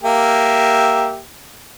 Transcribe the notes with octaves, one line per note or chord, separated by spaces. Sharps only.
A#3 G4 E5